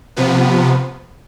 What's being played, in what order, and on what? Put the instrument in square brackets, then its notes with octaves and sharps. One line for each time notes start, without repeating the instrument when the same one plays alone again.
[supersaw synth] C3 F3 B3